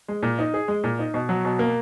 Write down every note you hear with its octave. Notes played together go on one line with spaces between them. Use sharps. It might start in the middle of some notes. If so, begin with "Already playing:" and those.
G#3
A#2
D#4
G#4
G#3
A#2
D#4
B2
F#3
B2
A#3